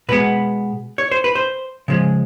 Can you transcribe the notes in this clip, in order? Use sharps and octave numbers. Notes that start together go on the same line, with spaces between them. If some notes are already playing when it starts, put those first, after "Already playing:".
B2 G#3 B3 B4
C#5
C5
B4
C5
C#3 F3 G#3